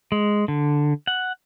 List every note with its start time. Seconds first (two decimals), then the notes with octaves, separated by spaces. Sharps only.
0.12 G#3
0.48 D3
1.07 F#5